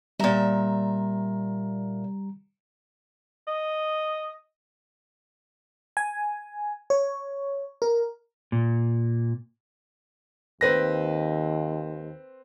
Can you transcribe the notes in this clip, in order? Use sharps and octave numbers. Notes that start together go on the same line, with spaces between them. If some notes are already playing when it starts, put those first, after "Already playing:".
A#2 G3 E5 A#5
D#5
G#5
C#5
A#4
A#2
D#2 C4 B4 A#6